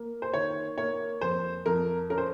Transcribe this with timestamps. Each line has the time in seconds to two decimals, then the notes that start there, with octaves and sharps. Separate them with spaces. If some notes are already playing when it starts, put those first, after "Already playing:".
Already playing: A#3
0.22 C5
0.34 D#3 C#5
0.78 A#3 C#5
1.21 F2 C5
1.66 F2 A#4
2.10 C#4 A#4
2.18 C5